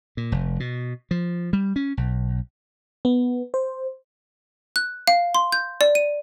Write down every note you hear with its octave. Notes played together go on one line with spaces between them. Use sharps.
A#2
F1
B2
F3
G3
C#4
B1
B3
C5
F#6
F5
C6
G6
D5
D#7